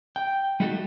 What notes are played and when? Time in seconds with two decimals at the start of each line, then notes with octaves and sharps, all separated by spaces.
0.16 G5
0.60 G3 A3 D#4 F#4 G4 A4